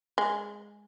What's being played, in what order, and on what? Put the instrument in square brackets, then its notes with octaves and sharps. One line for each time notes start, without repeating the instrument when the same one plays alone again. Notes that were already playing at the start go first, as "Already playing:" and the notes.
[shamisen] G#3